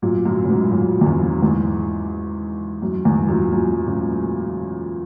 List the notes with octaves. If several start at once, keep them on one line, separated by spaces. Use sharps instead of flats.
F#2 A#2
F#2 A#2
C#3
G#2 B2
F#2 A#2
E2
F#2
E2 G#2
F#2
E2 G#2
F#2 A#2
F#2 A#2
A#2 C#3